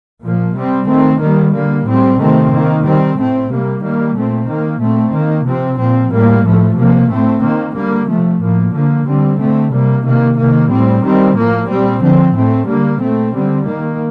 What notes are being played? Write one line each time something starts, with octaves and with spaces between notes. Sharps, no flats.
A#2 F3 A#3
C3 G3 C4
D#3 A3 C4
D#3 G3 A#3
D3 G3 A#3
A2 G3 C4
C3 D#3 A3 C4
D#3 A#3
D#3 G3 C4
A2 A3 C4
C3 G3 A#3
D#3 G3 A#3
A#2 A3 C4
D#3 A#3
A#2 A3 C4
D#3 A#3
C3 F3 C4
A#2 F3 C4
A2 G3 A#3
A2 F3 A3
C3 F3 A#3
A2 A3 C4
D#3 A#3
D3 G3 A#3
C3 F3 A3
A2 F3 A#3
D3 F3 A#3
D3 G3 C4
D3 A3 C4
C3 G3 A#3
C3 D#3 A#3
C3 D#3 A#3
A2 G3 C4
D#3 G3 C4
A2 F3 A#3
A#2 G3 C4
D3 F3 C4
A2 A3 C4
D3 G3 A#3
A#2 A3 C4
D3 G3 C4
D#3 A#3